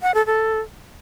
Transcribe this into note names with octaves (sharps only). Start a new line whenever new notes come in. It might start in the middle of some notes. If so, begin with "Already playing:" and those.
F#5
A4
A4